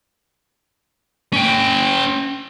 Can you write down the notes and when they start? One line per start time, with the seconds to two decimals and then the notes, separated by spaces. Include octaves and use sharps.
1.33 C#4 G5